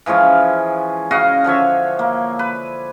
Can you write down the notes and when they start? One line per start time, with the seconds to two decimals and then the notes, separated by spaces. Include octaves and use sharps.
0.06 E3 F3 G#3 C#4
1.11 C#3 F#4 D#5 F5
1.44 D3 F3 C#5 E5
1.99 A#3
2.39 B4